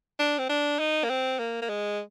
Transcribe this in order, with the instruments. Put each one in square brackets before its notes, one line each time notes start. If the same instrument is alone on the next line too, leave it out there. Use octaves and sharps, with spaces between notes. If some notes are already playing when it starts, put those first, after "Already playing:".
[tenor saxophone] D4
C4
D4
D#4
A#3
C4
A#3
A#3
G#3